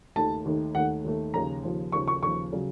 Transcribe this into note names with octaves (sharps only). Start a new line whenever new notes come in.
D#2 D#3 A3 A5
D#2 D#3 A3
D#2 D#3 A3 F#5
D#2 D#3 A3
D#2 C#3 F3 A#5
D#2 C#3 F3
D#2 C#3 F3 C#6
C#6
D#2 C#3 F3 C#6
C#3 F#3